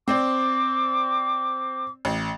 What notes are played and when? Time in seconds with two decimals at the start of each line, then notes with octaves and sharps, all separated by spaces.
0.08 C4 C5 D5 D6
2.05 A1